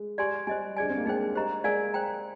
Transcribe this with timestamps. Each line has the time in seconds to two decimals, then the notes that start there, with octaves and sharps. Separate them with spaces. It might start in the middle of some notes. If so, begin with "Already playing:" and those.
Already playing: G#3
0.18 G4 D5 G#5 C6
0.47 G3 C5 D#5 G#5
0.77 D4 G#4 D5 G#5
0.90 C4
0.98 A#3
1.05 G#3 D#4 G#4 C5 G5
1.35 G4 C5 D#5 A#5
1.64 G#3 A#4 D5 F5 G#5
1.94 C5 G5 A#5